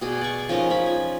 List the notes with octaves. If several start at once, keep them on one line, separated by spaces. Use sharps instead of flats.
B2 G#4 D5
D5 C#6
F3 C#4 D#4 A#4
F3 C#4 B5
G#5